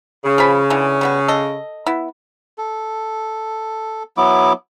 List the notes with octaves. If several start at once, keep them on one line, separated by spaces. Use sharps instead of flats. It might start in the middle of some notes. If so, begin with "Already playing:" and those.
C#3
F3 C#4 B5
D3 E3 D4
G3 B3 F#4
A4 D#5
B3 E4
A4
F#3 B3 E4 D6